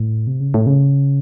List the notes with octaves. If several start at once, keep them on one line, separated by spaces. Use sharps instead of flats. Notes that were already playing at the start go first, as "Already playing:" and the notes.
Already playing: A2
C3
C#3
A2
C#3